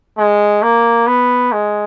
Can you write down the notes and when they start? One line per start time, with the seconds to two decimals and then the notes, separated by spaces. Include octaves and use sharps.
0.18 G#3
0.63 A#3
1.07 B3
1.52 G#3